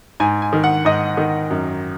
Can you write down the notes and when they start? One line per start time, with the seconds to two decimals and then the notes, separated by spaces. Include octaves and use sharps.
0.20 G#2 G#5
0.42 G#5
0.53 D#3
0.64 F#5
0.85 G#2 D#5
1.17 D#3
1.50 F#2